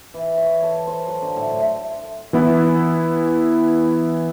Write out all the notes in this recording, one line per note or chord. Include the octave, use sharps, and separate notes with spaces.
E3
C#5
A4
C5
F#3
D3
A2
E3 B3 E4